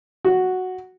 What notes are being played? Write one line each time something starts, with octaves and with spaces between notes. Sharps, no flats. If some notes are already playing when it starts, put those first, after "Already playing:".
F#4